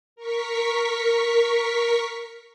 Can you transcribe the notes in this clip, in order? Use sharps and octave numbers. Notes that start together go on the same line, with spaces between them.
A#4 C#6 B6